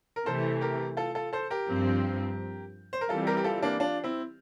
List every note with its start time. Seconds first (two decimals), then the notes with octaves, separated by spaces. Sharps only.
0.16 A#4
0.26 C3 E3 A3 A4 C5
0.61 G4 A#4
0.97 F4 A4
1.15 F4 A4
1.33 A4 C5
1.50 G4 A#4
1.68 G2 F3 C4
2.93 C5
3.01 A#4
3.09 E3 G3 C4 F4 A4
3.27 G4 A#4
3.37 G4
3.44 F4 A4
3.63 A#3 D4
3.80 D4 F4
4.04 C4 E4